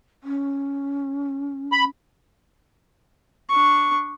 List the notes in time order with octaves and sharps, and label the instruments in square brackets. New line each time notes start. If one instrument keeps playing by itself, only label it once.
[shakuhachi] C#4
[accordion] B5
[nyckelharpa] D4 C#6